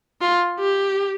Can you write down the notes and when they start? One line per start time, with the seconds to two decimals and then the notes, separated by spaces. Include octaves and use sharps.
0.21 F4
0.59 G4